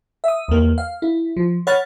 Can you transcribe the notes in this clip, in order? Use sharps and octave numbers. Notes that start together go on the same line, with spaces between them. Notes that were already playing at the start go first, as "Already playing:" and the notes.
E5 D#6
E2 A#3
F5
E4
F3
C#5 F#5 B5 F6 A6